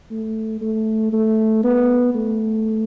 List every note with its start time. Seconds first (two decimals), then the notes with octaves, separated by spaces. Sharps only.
0.11 A3
0.61 A3
1.13 A3
1.64 B3
2.14 A3